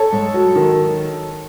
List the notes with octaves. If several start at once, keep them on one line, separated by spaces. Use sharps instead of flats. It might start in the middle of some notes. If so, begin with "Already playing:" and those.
Already playing: A4 C#5
G#2
F#3
D#3